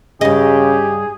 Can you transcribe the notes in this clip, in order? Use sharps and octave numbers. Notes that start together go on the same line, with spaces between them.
G2 C#3 G4 G#4 D#5